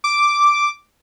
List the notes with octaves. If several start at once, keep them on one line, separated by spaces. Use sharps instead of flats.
D6